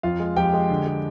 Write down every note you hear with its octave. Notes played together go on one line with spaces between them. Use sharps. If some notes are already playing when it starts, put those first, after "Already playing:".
F2 F4 F5
G#3
F2 G4 G5
G#3
D3
G#3